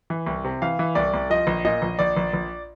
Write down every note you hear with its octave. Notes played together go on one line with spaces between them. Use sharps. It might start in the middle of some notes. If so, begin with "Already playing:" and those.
E3
C2
C3
E3 F5
E3
C2 D5
C2
F3 D#5
A#1
A#2 D#5
A#1
A#1 D5
A#1
A#1